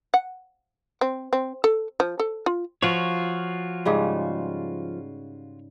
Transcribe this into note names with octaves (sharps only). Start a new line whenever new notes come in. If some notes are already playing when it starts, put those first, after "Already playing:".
F#5
C4
C4
A4
F3
A4
F4
F3 F4 F#4 C#5
G#2 C#3 G3